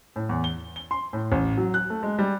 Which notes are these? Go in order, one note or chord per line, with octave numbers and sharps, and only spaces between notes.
A2
E2
G7
G7
C6
A2
A1
F#3
F#6
A3
G#3
G3